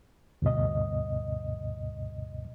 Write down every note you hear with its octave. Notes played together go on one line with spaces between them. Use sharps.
D2 G2 B2 D#5